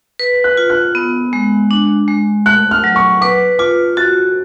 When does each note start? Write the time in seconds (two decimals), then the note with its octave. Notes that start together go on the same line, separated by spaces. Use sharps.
0.19 B4
0.44 F#6
0.57 F4
0.70 F#6
0.95 B3
1.33 G#3
1.71 D4
2.08 G#3
2.46 A3 F#6
2.71 F6
2.84 F#3
2.96 C#6
3.21 B4 D6
3.59 F4 D6
3.97 F#4 A6